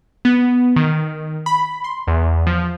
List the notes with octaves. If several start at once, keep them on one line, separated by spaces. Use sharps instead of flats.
B3
D#3
B5
C6
E2
F3